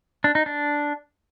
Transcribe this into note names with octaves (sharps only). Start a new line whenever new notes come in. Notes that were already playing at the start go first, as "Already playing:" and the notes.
D4
D#4
D4